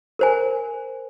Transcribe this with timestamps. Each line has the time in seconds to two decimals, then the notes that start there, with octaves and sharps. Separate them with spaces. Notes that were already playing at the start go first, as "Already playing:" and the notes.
0.19 A#4 C5 G#5